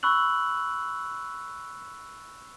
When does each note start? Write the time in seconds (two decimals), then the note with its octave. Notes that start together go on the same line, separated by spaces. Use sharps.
0.03 B5 C#6 E6 F#6 F#7